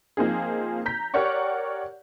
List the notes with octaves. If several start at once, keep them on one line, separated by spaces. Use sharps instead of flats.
F3 A#3 C4 D#4 G#4
A#5 G6 B6
G4 A#4 C#5 D5 F#5 C#6